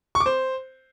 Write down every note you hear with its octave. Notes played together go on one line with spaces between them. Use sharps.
C#6
D6
C5